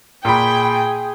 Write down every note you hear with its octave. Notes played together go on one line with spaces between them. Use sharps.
A#2 G#4 G5 B5